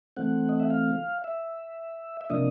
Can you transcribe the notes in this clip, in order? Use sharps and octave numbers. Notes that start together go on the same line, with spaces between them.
E3 A3 C4 F#5
D#5
E5
F5
E5
E5
C3 F3 A#3 D4 D#5